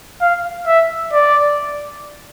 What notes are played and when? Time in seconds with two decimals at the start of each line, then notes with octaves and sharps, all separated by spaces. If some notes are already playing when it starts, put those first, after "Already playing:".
0.21 F5
0.67 E5
1.13 D5